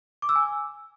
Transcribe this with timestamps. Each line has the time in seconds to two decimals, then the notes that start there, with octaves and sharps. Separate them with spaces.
0.22 D6
0.29 E6
0.36 G#5